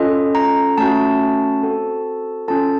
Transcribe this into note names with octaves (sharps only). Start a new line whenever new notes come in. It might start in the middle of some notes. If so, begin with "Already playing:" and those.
Already playing: C#4 F4 A4 D#5
A#5
A3 C#4 F#4 A5
C4 F#4 A4
C#4 F4 A4 A5